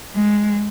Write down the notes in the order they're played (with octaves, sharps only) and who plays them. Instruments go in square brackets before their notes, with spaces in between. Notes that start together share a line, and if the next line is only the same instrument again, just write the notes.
[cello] G#3